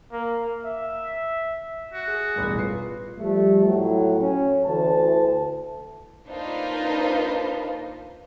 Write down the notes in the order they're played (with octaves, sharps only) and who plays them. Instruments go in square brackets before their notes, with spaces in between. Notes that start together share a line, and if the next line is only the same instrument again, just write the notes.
[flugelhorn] A#3
E5
[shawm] F#4
[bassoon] G#4
[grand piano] E1 A1 G2
F4 B4 C7
[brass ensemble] F3 G3 A3
A2 F#3
C#4
D2 E3 A5
[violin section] A#3 D4 D#4 F4 B4 C5